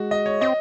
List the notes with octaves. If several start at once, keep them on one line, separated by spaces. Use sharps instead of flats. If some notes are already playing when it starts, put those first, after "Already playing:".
Already playing: G#3 F#4
D#5
C#5
C4 D#5